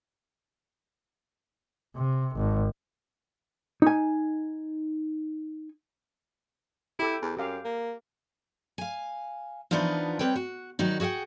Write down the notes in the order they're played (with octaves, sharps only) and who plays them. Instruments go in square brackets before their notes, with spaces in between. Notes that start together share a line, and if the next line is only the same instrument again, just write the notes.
[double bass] C3
G#1
[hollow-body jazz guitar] D#4 G#5
[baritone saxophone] E4 [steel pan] G4 A4
[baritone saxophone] E2
[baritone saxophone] F#2 [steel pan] G4 F5
[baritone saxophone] A#3
[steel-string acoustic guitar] F5 G#5
E3 F3 B3 D4 D#4 F4
G3 C4 B4 C#5 G5
F#4
D#3 F#3 G3 D#4 F#4
F#4 G#4 E5 F#5 G5